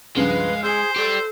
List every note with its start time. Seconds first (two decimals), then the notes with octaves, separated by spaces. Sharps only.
0.16 C#2 G2 F3 G#3 B4 F5
0.63 G#4 C5 E6
0.96 G4 A4 D5